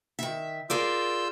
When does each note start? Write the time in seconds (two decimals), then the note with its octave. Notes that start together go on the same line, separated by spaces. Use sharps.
0.19 D#3 E5
0.70 F4 G#4 A#4 D5 E6 G6